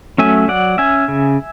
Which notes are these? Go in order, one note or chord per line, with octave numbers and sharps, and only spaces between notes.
F#3 A3 C#4 E5 G#5
F#3 D5 F#5
C#4 E5 G#5
C#3